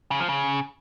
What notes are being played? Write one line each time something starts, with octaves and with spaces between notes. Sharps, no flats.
C#3
F3
C#3